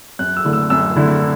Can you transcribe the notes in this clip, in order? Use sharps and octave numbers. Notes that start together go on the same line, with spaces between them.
F#2 F#6
E6
D3 A3 E4
E6
F#2 E6
D3 A3 E4